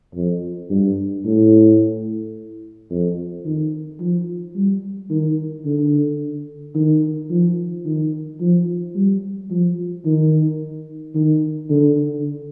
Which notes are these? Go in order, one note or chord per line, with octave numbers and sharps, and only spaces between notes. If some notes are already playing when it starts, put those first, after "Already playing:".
F2
G2
A2
F2
D#3
F3
G3
D#3
D3
D#3
F3
D#3
F3
G3
F3
D#3
D#3
D3